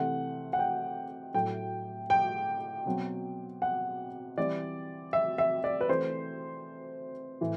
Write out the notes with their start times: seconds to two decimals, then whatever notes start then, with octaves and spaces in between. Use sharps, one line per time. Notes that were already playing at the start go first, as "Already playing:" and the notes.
Already playing: C3 E3 A3 C4 F#5
0.53 F#5
0.59 G5
1.34 A2 F#3 A3 G5
2.10 G5
2.86 B2 F#3 C4
3.62 F#5
4.38 E3 G3 C4 D5
5.13 E5
5.38 E5
5.64 D5
5.81 B4
5.89 E3 A3 C4 C5
7.41 A2 E3